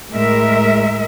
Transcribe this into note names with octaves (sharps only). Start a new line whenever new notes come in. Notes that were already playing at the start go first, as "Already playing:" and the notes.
A2 G#3 A#4 E5